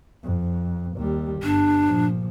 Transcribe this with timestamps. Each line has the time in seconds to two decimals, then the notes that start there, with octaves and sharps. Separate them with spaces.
0.24 F2
0.97 D#2 G3
1.43 G1 D4
1.84 A#2 F3